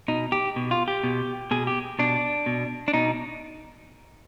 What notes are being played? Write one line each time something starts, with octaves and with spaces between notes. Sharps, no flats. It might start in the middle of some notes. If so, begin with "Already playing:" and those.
B2 D#4
G4
B2
F4
G4
B2
B2 G#4
G4
B2 D4
B2
D4
B2 D#4